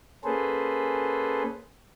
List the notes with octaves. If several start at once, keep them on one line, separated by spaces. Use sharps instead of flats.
A#3 C#4 G#4 A4 B4 C5